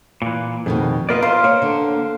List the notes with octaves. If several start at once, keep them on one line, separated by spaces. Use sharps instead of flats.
A#2 E3
F2 B2 D#3 G#4
B3 F4 A#4 B4 D5 D#5
C5 F5
A#3 C#5
D3